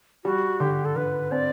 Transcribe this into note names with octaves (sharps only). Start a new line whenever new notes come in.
G3 F#4
D3 G4
A4
D3 B4
C4 D5